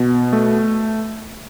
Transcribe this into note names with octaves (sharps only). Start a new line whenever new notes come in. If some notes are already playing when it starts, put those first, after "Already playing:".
Already playing: B2
A3